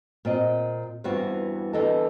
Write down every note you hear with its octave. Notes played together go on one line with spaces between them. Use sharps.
A#2 C4 D#5
E2 G2 E3 C4 F4 F#4
E2 D3 E3 A4 D#5 A5